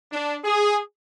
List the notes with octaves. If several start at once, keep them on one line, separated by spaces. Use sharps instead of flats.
D4
G#4